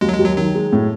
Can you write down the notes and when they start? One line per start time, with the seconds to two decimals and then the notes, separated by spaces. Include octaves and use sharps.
0.01 D#2 G#3
0.09 F#3
0.13 G#3
0.19 D#2
0.26 F#3
0.37 D#3 F#3
0.55 G#3
0.72 A2